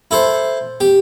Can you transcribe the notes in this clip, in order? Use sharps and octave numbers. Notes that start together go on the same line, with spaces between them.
E4 A4 C5
G4